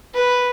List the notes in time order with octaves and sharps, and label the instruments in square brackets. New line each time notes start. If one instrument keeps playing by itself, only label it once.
[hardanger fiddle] B4